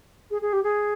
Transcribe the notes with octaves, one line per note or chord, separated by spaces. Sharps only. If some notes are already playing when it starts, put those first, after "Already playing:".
G#4
G#4
G4
G#4